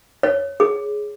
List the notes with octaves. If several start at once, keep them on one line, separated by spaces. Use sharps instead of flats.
C#5
G#4